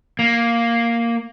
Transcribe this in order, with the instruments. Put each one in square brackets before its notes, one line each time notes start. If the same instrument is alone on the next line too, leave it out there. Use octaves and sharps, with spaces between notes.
[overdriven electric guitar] A#3